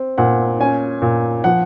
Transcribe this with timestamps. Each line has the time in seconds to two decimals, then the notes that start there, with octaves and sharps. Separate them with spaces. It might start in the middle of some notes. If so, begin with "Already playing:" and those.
Already playing: C4
0.18 A#2 F#5
0.60 C#4 G#5
1.02 A#2
1.44 F3 F#5